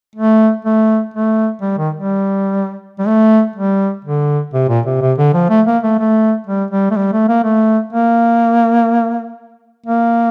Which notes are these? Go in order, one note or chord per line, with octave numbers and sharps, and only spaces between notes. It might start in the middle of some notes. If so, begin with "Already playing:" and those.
A3
A3
A3
G3
D#3
G3
G3
A3
G3
D3
C3
A#2
C3
C3
D3
F3
A3
A#3
A3
A3
G3
G3
A3
G3
A3
A#3
A3
A#3
A#3